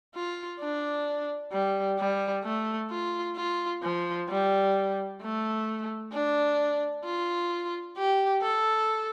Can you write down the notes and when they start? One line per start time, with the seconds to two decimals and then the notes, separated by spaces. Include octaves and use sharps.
0.15 F4
0.60 D4
1.52 G3
1.99 G3
2.44 A3
2.90 F4
3.36 F4
3.83 F3
4.29 G3
5.22 A3
6.13 D4
7.05 F4
7.97 G4
8.43 A4